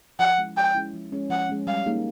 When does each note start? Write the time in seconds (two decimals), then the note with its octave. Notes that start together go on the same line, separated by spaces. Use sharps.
0.19 F3 F#5
0.38 G#3 C#4 E4
0.57 F3 G5
0.75 G#3 C#4 E4
0.94 F3
1.12 G#3 C#4
1.30 F3 F#5
1.49 G#3 C#4
1.67 G3 F5
1.86 A#3 D#4 G#4